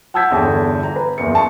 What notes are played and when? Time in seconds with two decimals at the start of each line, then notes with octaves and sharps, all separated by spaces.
0.14 F#5 A5 E6 G6 G#6 B6
0.31 G1 E2 D3 C#5 G5 A5
0.83 A#5
0.96 B4
1.18 F#1 E2 C#7
1.35 A5 C6 C#6 C#7